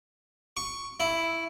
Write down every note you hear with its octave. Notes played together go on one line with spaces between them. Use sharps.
C#6
E4